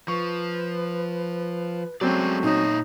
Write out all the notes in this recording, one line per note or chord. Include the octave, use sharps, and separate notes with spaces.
F3 B4 C#6
F#3 G#3 A3 C4 C#4 D5
A#2 D#4 C#5